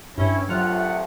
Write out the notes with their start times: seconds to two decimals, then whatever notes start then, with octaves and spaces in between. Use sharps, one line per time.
0.18 G2 C#4 E4
0.49 C2 F#3 A3 F4 F#5